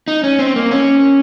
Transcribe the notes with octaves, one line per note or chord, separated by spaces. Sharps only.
D#4
C#4
C4
A#3
C#4